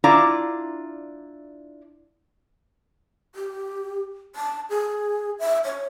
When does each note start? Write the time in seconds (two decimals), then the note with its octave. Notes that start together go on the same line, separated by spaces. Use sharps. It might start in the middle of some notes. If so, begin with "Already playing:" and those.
0.04 D4 E4 F4 D5 A#5
3.35 G4
4.36 A5
4.70 G#4
5.40 E5
5.64 C#5